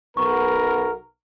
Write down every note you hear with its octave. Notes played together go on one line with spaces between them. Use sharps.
B1 B3 A#4 C#6